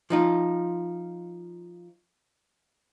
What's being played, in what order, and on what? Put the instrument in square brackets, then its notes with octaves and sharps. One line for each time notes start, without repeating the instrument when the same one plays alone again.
[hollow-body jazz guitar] F3 D#4 F4